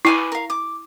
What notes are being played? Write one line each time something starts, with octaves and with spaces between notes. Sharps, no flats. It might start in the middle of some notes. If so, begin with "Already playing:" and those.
E4 B4 G#5 D6
A#4 F5
D6